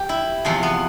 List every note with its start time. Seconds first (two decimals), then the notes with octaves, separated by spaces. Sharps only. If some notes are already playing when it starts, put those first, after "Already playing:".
Already playing: G4
0.09 E4
0.45 E2 C3 F3
0.63 B3